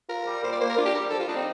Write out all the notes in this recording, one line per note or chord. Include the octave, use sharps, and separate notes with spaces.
F4 A#4
G3
A#2 C5
D5
A#3 C5
A#4
D4 F4
G4
G3 A#4
F3 A4
F4
D4 D#4
C4